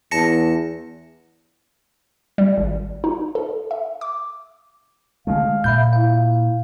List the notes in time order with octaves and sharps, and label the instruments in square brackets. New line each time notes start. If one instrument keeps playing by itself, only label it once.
[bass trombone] E2 [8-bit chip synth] A5 A#6 C#7
[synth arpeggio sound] G3
G#1
D#4
A4
E5
D6
[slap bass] D3 G#3 A3 [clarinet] F5
[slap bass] A#2 [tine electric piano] E5 B5 G6
[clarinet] E4 [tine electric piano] F5